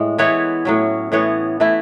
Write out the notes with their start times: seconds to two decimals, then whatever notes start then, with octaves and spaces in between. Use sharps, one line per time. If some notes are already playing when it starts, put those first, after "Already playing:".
Already playing: A2 G#3
0.18 E3 B3 E4 C#5
0.65 A2 F#3 C#4
1.12 A2 E3 B3 C#5
1.60 E3 A3 E4